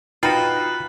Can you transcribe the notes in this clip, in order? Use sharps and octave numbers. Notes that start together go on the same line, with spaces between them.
D#4 F4 F#4 B4 G5